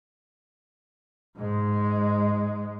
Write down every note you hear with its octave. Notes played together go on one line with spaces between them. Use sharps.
G#2 G#3